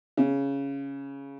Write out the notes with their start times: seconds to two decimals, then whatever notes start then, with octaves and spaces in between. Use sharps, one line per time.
0.17 C#3